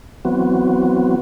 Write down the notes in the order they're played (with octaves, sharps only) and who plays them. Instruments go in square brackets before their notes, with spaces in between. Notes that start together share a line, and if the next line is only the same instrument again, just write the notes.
[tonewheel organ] E3 F#3 B3 C4 F#4